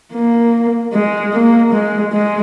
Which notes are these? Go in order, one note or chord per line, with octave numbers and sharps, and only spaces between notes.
A#3
G#3
A#3
G#3
G#3